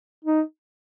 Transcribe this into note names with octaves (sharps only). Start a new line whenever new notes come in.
D#4